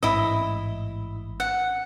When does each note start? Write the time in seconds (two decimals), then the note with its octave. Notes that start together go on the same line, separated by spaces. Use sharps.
0.03 A1 G#2 E4 D#5
1.40 F#5